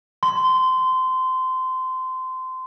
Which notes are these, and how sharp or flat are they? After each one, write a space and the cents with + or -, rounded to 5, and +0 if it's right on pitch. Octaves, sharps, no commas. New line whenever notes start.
C6 -20